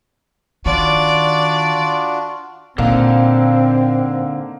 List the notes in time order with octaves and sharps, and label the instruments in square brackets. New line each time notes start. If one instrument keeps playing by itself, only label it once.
[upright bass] D#3 [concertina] D4 F4 F#4 [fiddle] D5
[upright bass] A#2 [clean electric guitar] D3 [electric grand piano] A#3 D#4 F5 [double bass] C4